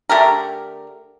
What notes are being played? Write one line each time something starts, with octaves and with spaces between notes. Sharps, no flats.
D3 A3 G4 A#4